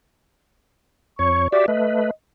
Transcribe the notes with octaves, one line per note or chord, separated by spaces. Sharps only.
F2 C#5 C#6
F#4 G4 D5 E5
A3 B4 D#5